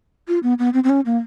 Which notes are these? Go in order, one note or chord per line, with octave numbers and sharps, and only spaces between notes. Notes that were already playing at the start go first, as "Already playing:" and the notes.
F4
B3
B3
C4
C4
C#4
A#3